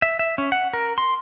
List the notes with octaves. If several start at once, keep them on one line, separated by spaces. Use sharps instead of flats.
E5
E5
C#4
F#5
A#4
C6